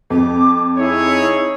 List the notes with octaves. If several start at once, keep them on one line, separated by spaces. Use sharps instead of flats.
F2 D6
D#4 E4 G#4 C#5